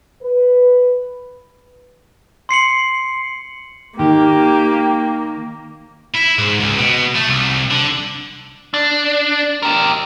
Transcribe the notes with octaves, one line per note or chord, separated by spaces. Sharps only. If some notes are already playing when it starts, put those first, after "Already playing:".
B4
C6 C7 C#7 F#7
D#3 A#3 G4
E4
G#2
C#2
B2
A3
C2
D3
D4
G4 A#4